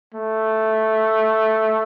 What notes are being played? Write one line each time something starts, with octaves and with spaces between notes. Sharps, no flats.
A3